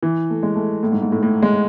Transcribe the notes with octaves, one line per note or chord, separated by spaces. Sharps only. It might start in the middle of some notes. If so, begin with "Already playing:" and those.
E3
A3
G#3
A3
A2
G#2
G#2
A2
A2
G#3